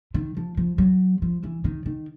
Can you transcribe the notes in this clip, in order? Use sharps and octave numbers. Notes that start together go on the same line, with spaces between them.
D#3
F3
F3
F#3
F3
E3
D#3
D#3